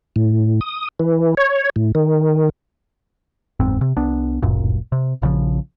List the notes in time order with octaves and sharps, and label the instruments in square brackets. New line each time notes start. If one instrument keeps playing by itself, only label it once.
[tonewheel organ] A2
D#6
E3
C#5
A2
D#3
[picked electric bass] F#1 E2 G#2 C4
C3
C2 B3 D4
D1 G1 F#2 A#2
C3
A#1 C#3 E3 F3